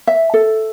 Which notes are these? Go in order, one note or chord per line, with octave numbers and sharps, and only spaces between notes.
E5
A4